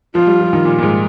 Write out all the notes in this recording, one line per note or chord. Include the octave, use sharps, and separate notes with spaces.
F3 F4
G3
F3
D#3
A#2
A#2
G#2